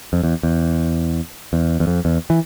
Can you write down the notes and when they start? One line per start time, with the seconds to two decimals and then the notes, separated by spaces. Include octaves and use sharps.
0.13 F2
0.23 E2
0.43 E2
1.53 E2
1.80 E2
1.87 F2
2.05 E2
2.30 E3